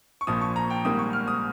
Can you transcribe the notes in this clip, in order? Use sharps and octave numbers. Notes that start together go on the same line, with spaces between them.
C#6
A#1 A#2 F3 D#6
C#6
A#5
G5
G#1 G#2 G3 A#3 D#6
C#6
F6
D#6